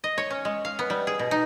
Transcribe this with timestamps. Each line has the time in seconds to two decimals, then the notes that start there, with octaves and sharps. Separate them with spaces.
0.04 D#5
0.18 C#5
0.30 C#4
0.45 G#3
0.65 F5
0.79 B3
0.90 G3
1.07 G#4
1.19 B2
1.31 D#4